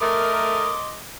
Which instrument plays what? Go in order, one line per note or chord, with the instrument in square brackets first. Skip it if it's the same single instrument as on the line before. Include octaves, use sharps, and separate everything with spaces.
[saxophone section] A3 A#4 [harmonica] D#5 C6 D6 [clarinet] D#6